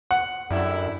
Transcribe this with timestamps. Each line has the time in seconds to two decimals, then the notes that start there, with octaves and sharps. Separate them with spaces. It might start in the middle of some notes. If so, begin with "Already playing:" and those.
0.11 F#5
0.51 F#2 D3 G3 E4